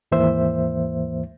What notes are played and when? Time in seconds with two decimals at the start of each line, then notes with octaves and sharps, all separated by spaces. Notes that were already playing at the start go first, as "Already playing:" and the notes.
0.12 D#2 G#2 E3 A#3 C5 E5